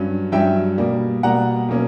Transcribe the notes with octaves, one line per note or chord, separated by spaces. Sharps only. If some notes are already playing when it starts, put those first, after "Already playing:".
Already playing: G2 F#3 C#4
G2 F#3 C#4 E5 G5
B2 G3 A#3
B2 G3 A#3 F#5 A#5
B2 F#3 A#3 C#4